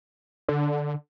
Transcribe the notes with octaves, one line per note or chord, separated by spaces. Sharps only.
D3